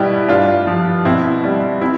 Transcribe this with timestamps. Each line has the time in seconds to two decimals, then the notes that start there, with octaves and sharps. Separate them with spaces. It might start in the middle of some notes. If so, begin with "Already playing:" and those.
Already playing: B2 G3 E4 G4
0.29 G2 D4 F4
0.67 F3
1.05 B2 C4 E4
1.44 G3
1.81 C4 E4